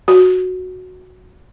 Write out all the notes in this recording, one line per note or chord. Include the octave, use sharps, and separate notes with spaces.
F#4